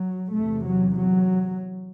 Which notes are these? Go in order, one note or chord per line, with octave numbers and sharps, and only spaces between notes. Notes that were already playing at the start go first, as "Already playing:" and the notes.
Already playing: F#3
E2 C3 A3
F#3
F#3